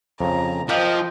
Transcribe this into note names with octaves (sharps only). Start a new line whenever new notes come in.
F2 C#3 A#5
F3 G4 A#4 D#5 F5 G5